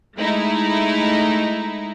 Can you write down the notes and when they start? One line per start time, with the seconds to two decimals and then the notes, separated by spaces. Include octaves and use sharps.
0.18 G#3 A3 D#4 E4